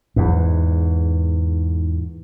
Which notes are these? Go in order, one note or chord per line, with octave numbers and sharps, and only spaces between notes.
E2 G#2